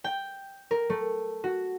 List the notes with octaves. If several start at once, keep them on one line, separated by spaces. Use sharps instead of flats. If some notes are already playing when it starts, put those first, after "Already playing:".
G5
A#4
A3
F#4